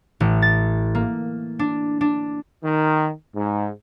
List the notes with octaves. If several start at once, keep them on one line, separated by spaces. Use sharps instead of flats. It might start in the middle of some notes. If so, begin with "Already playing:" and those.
A1
A6
A#3
D4
D4
D#3
G#2